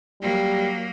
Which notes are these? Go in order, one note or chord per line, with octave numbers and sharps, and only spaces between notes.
F#3 G3 A#3